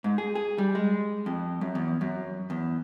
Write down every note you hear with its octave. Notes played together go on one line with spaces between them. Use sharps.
G#2
G#4
G#4
G3
G#3
F2
F#2
E2
F#2
E2